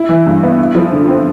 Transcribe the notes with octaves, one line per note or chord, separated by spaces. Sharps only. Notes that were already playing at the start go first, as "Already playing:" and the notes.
Already playing: E4
E3
G2
B3
E4
F3
D3
C4